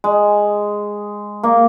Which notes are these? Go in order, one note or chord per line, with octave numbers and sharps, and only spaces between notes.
G#3
A#3